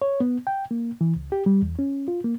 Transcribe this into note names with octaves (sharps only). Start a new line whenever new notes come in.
C#5
B3
G5
A#3
E3
C#2
G4
G3
E2
C#4
F4
A#3